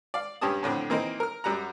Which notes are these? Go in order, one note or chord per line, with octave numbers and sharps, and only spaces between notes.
D5 F5
G2 C#4 G4 A5 D#6
F2 A2 D3 C4
E3 A#3 C4 D#4
A#4 F6
F#2 G3 F#5 A#5